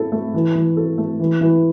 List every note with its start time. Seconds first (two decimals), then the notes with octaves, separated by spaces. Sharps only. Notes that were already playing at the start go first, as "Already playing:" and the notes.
Already playing: E4 A4
0.12 A3
0.34 E3
0.55 E3
0.77 A4
0.98 A3
1.20 E3
1.41 E3